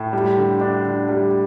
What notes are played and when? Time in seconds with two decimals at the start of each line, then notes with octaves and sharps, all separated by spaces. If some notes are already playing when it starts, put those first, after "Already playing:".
Already playing: A2
0.13 G3
0.37 D3
0.61 D4
0.85 D3
1.09 G3